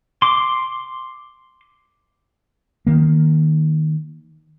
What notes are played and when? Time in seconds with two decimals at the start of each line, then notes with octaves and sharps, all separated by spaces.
0.22 C6 D6
2.87 D#3 A#3